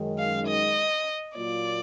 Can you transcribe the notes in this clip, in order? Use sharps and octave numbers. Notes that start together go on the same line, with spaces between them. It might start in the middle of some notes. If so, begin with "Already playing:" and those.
Already playing: F#2 D#3 G#3
F5
D#5
A#2 F#3 A#3 F4 D5